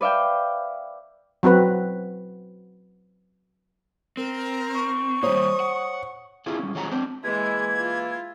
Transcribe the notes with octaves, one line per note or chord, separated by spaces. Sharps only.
B4 D5 E5 F5 G5
F#3 C4 F#4 B4
C4 A#4
C#6
G3 A#3 C5 C#5 D#6
F#5
D4 E4 F4 G#4 C5
G3 C#4
F3 G#3 C#5 F#5 A#5
C4 D4 C5
E3 G#3 A#3 E4 G#6
F4